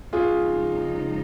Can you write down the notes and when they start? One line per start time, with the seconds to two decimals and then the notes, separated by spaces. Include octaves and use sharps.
0.12 F2 C#3 G#3 C4 D#4 F4 G#4